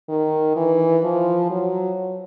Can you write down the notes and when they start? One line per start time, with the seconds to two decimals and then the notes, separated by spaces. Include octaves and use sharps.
0.09 D#3
0.56 E3
1.04 F3
1.50 F#3